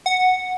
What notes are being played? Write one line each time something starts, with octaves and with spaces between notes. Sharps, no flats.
F#5